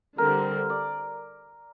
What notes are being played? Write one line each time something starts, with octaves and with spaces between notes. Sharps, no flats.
D3 G3 C4 A#4
D5